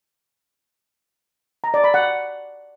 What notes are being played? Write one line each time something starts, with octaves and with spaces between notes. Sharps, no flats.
A#5
D5
B5
F#5